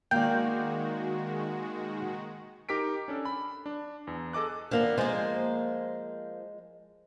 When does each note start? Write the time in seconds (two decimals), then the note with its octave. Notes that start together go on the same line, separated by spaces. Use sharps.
0.11 D#3 G#3 A#3 F#4 D5 G5
2.69 D#4 G4 A#4 B6 D7
3.08 C#4 D4 A4
3.25 B5
3.66 D4
4.07 E2
4.33 G#4 A4 D#5 D6 F#6
4.71 D#2 F3 A#3 B3 D4
4.98 F3 G#3 A#3 C5